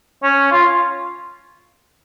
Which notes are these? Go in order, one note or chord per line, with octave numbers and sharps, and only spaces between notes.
C#4
F4